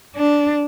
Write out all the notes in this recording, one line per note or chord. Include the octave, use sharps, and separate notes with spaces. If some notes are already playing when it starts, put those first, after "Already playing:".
D4